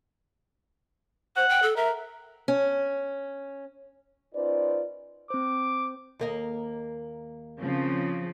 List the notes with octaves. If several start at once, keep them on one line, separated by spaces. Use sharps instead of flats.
C5 F#5
G5
A4
A#4 E5
C#4
C#4 D#4 F4 B4 C5 D5
C4 C5 D6
D#2 A#3 D#5
C#3 F3 C4